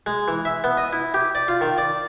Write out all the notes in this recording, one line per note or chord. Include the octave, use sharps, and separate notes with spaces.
G#3
E3
E5
B3
D#5
E4
G4
D5
F4
D#3
D5